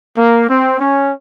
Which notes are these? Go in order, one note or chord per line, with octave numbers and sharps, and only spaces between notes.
A#3
C4
C#4